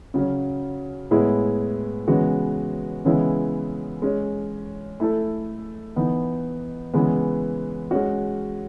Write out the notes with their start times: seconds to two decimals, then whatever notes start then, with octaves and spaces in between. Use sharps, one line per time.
0.14 C#3 F#3 C#4
1.11 A2 G#3 B3 E4 G#4
2.08 C#3 E3 G#3 B3 F#4
3.05 C#3 E3 G#3 B3 E4
4.02 G#3 C#4 G#4
5.00 A3 E4 A4
5.96 E3 B3 D#4
6.94 C#3 E3 G#3 B3
7.91 G#3 C#4 F#4